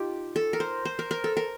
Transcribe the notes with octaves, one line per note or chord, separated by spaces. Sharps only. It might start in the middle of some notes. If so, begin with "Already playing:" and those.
Already playing: D#4 F4 G4
A4
A#4
C5
C5
A#4
A#4
A4
A#4